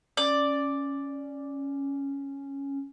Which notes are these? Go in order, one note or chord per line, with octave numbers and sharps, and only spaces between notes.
C#4 D5